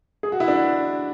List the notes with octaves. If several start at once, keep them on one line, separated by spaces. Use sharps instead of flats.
G#4
F#4
E4
D4